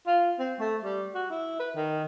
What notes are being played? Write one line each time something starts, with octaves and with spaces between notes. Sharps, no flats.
F4
C4
A3
G3
F#4
E4
B4
D#3